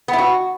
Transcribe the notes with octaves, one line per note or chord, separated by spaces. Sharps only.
B3
E4
F#4